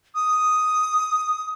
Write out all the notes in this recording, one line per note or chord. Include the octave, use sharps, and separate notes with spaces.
D#6